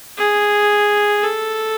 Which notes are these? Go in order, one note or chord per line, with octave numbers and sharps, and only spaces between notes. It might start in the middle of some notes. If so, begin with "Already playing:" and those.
G#4
A4